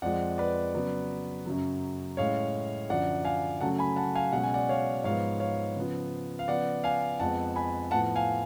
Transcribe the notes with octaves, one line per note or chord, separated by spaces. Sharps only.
F2 F3 G#3 D5 F#5
B4 D5
C#3 F#3 B3
F#2 C#3 F#3
A2 G#3 C#4 C#5 F5
F#2 D3 F3 D5 F#5
F5 G#5
C#3 F#3 A3 C#4 F#5 A5
G#5 B5
F#5 A5
F5 G#5
B2 G#3 C#4 F#5
G#5
D5 F#5
C#5 F5
G#2 F3 G#3 B3 C#5 F5
C#5 F5
C#3 F3 B3
F5
C#3 F3 B3 D5 F#5
F5 G#5
F2 F3 G#3 B3 F#5 A5
G#5 B5
A2 F3 B3 F#5 A5
F5 G#5